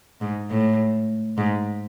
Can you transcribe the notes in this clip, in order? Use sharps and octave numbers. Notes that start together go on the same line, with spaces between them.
G#2
A2
G#2